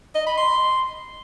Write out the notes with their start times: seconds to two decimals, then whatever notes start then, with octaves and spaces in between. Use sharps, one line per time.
0.15 D#5
0.26 B5
0.37 C6